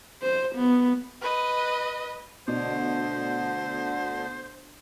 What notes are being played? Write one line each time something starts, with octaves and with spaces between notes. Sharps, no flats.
C5
B3
B4 D#5
D2 B2 D3 D4 C5 D5